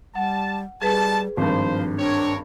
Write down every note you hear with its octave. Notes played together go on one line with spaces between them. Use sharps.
G3 F#5 A5
B2 D#3 G3 G#4 B4 A5
G#1 G2 F3 C5
C4 D4 A#4 C#5